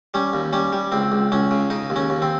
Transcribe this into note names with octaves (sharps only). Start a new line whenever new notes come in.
G3 C#4
D#2
G3 C#4
G3
C#2 C4
C#2
C#2 C#4
C#3
C#3 D#4
D#2
C#4
D#2
C4